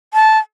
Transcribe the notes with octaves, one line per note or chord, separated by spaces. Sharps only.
A5